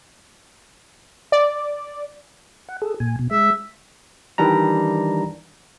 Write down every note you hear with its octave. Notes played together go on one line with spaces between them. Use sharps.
D5
F#5
G#4 A4
A#2 G#5
B2
G#3 E5
D#3 E3 G3 D4 A#5